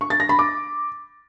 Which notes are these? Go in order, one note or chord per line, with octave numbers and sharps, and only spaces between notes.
C#6
A6
A#6
B5
D6